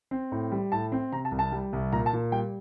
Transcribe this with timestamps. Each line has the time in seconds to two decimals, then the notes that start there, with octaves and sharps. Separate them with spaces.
0.11 C4
0.32 A2
0.52 G3
0.72 A2 A5
0.92 C4
1.12 C3 A#5
1.25 A5
1.31 C2
1.39 A5
1.52 G3
1.73 C2
1.92 A#2 A#5
2.06 A5
2.13 A#2
2.32 G3 G5